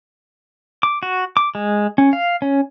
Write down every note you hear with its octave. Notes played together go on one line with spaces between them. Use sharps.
D6
F#4
D6
G#3
C#4
F5
C#4